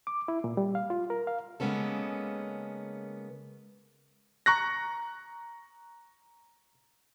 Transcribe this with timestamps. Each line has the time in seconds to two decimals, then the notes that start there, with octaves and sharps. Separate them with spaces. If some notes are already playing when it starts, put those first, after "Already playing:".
0.07 D6
0.28 E4
0.44 A#2
0.57 G3
0.75 F5
0.90 F4
1.10 A#4
1.27 F5
1.60 C#3 G#3 A#3 B3 C#4 A4
4.46 A#5 C#6 F#6 A#6